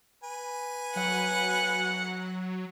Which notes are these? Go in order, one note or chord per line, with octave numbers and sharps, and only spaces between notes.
B4 G#5
F#3 F#5